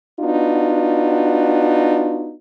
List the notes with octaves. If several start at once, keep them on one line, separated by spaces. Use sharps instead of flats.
B3 D4 D#4 F4 F#4